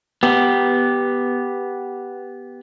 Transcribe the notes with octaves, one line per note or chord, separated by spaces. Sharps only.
B3 G4